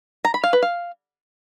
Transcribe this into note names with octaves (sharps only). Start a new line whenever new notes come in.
A#5
B5
F5
B4
F5